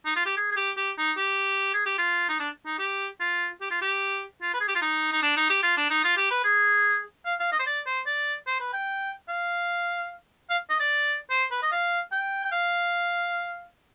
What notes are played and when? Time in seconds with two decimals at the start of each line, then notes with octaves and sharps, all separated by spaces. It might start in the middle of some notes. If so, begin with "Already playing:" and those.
0.05 D#4
0.16 F4
0.26 G4
0.37 G#4
0.52 G#4
0.57 G4
0.77 G4
0.98 D#4
1.17 G4
1.74 G#4
1.86 G4
1.98 F4
2.29 D#4
2.40 D4
2.66 D#4
2.79 G4
3.20 F4
3.61 G4
3.71 F4
3.82 G4
4.42 F4
4.54 B4
4.61 G#4
4.68 G4
4.76 F4
4.82 D#4
5.13 D#4
5.23 D4
5.37 D#4
5.50 G4
5.63 F4
5.77 D4
5.90 D#4
6.04 F4
6.17 G4
6.31 B4
6.45 G#4
7.25 F5
7.40 F5
7.52 D#5
7.60 C5
7.66 D5
7.86 C5
8.06 D5
8.47 C5
8.60 B4
8.73 G5
9.29 F5
10.50 F5
10.70 D#5
10.80 D5
11.30 C5
11.51 B4
11.63 D#5
11.72 F5
12.12 G5
12.45 G5
12.52 F5